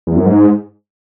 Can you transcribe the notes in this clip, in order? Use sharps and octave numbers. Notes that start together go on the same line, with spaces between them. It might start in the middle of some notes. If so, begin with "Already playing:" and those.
E2
F#2
G#2